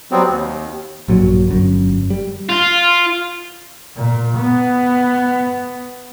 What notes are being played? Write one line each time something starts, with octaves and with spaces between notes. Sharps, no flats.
F#3 G3 B3 C4
D#2
A#1 G2 A#2 F#3
G1 F#2
G3
F4
A#2
B3